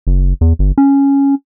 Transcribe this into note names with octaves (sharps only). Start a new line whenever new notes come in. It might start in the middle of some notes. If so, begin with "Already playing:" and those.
F#1
E2
G1
C#4